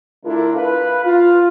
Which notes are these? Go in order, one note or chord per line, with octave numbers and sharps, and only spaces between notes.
D3 A3 D4 E4 F4 A#4
B4 F5
F4